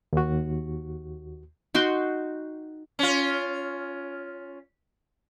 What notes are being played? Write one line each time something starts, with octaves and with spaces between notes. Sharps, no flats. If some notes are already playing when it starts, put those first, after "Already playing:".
D#2 F#4
D#4 F#4 G5 C6
C#4 F4